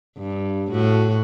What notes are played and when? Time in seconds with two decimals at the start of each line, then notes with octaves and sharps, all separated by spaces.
0.18 G2
0.71 A2 F#4